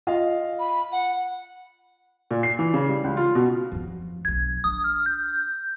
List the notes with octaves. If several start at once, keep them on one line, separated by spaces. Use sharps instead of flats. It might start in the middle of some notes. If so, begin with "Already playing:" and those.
F4 D#5 F5
B5
F#5
A#2
C7
E3
C#3
G3
C#2
F4
B2
F2 F3
B1 D4 G#6
D4 E4 D#6
F6
G6